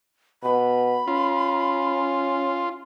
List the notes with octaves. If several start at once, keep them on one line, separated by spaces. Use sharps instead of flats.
B2 B5
C#4 F4